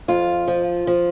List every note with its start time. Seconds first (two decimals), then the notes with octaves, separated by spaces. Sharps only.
0.08 F2 F4
0.48 F3
0.87 F3